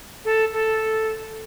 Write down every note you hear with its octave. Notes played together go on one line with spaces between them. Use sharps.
A4
A4